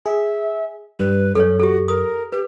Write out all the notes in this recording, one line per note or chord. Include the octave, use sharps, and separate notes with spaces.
G#4 E5
G2 G3 B4
F#2 C#4 A4 C#5
F#4 G4 A4
A#4 D#6
G4 B4